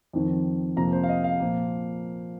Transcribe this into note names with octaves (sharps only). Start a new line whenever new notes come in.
F2 D#3 C4
F2 C3 F3 A#3 A#5
C5
F5
D#5
F5
A#2 F3 A#3